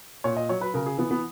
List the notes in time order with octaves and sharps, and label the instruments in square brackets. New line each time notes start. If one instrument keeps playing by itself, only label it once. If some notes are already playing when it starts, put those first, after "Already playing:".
[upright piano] A#2 C#5
D#5
F#3 C#5
B4
C#3 A#4
G#4
E3 B3
B3